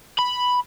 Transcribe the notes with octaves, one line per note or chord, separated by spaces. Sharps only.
B5